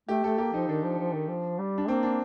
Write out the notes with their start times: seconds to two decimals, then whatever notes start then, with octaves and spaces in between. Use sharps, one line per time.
0.08 A3 G4
0.24 A3 A4
0.38 A#3 G4
0.54 F3 D#4
0.68 D#3 D4
0.83 F3
0.98 F3
1.14 D#3
1.28 F3
1.58 G3
1.78 D4
1.88 A#3 C4
2.03 D4